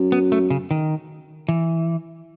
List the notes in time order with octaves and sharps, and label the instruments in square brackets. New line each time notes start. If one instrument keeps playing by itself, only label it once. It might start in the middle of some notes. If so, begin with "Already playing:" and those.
Already playing: [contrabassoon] F#2
[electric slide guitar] B3
A3
C#3
D#3
E3